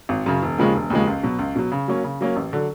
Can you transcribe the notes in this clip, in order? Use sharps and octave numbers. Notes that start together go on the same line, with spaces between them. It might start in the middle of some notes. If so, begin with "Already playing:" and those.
G#1
F#2 C#3
E1
D#2 C#3 F3 G#3
E1
D#2 C#3 F3 G#3
C#2
B2 F#3
C#2
B2 F#3
C#3
F#3 A#3 C#4
C#3
F#3 A#3 C#4
A1
D3 F#3